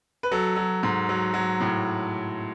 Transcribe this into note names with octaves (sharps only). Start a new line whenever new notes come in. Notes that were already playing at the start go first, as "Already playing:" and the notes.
B4
F#3 A4
F#3
G#2
F#3
F#3
A2